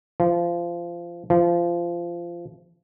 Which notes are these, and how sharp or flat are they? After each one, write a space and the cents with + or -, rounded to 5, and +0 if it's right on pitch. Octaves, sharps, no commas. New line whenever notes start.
F3 -20
F3 -20